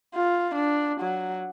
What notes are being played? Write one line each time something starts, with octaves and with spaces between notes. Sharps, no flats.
F4
D4
F#3